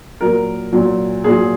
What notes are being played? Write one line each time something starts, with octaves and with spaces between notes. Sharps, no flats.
A#2 F#3 A#4
A#2 F#3
A#2 F#3 G#4